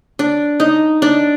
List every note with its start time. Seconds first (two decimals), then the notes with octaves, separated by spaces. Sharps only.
0.19 D4
0.60 D#4
1.02 D4